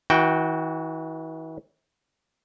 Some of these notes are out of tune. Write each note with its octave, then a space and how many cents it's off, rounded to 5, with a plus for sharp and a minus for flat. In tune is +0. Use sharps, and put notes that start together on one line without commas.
E3 -40 F#4 +0 G5 +0